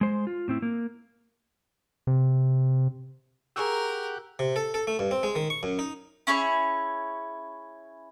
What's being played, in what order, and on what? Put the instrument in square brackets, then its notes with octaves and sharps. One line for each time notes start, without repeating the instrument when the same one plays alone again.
[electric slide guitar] G#3 C5
F4
A2 C4 E4
A#3
[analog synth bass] C3
[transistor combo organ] G4 F#5 [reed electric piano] G#4 C#6 E6 [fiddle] A#4
[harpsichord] C3
A4
A4
A3
G2
C4
G#3
D#3
C#6
F#2
D#4
[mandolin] C#4 E4 G#4 C#5